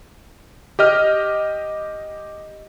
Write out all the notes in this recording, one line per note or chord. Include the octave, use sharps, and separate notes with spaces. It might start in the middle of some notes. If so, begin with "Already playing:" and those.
G4 D#5 F6